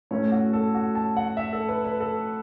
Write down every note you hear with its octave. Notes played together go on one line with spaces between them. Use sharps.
A2 A3 C#4 C#5
F#4
A4
F#4
A5
F#5
E5
A4
B4
B4
A4